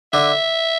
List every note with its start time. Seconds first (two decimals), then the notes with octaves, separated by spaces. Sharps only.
0.13 D3 E5